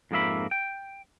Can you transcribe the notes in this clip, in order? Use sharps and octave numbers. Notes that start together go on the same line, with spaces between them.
F2 G#2 F3 A#3 E5 B5
G5